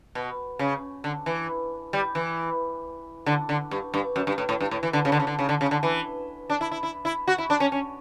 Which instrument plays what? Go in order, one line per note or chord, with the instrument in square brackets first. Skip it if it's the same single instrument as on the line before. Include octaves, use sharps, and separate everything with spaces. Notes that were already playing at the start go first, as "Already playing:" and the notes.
[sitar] B2
C#3
D3
E3
G3
E3
D3
D3
G2
G2
F#2
G2
A2
A2
G2
A2
E3
D3
C#3
D3
C#3
D3
C#3
D3
C#3
D3
E3
D4
E4
E4
E4
E4
F#4
E4
D4
C#4
C#4